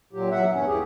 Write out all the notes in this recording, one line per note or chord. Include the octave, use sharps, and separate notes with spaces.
A#2 F#3 G4
E2 F#3 E5 F#5
E2 G2 C#4
D#2 E3 G4 G#4